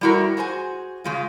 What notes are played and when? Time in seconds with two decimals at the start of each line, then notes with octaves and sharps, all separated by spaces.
0.01 G3 A3 E4 F#4 A#4
0.37 F#4 G#4 C5 G#5
1.04 C#3 G#3 F4